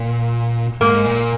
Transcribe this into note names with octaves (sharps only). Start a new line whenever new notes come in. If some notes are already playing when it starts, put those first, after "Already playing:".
Already playing: A#2
G#2 A#3
A#2